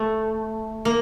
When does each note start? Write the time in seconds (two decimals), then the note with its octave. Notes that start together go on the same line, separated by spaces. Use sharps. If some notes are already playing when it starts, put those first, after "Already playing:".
Already playing: A3
0.85 A#3